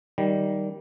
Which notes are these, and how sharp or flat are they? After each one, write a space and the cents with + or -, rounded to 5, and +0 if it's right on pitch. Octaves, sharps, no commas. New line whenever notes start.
D#3 +0 G3 -15